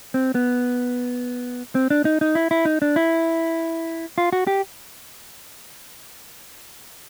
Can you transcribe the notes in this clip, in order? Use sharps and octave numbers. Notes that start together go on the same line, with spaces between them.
C4
B3
C4
D4
D#4
D#4
E4
E4
D#4
D4
E4
F4
F#4
G4